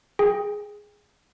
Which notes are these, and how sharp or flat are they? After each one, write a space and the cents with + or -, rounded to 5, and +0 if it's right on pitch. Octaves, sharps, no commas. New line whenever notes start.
G#4 +0 G5 +25